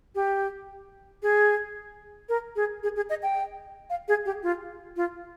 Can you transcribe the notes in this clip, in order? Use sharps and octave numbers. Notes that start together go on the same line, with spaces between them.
G4
G#4
A#4
G#4
G#4
G#4
D#5
G5
F5
G#4
G4
F4
F4